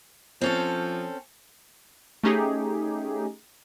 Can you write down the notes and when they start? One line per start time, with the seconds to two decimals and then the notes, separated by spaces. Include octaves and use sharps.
0.41 F3 C4 C#4 A4
2.23 A3 C#4 D#4 G4 G#4